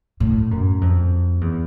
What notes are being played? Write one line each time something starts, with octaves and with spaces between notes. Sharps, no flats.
A2
F#2
F2
E2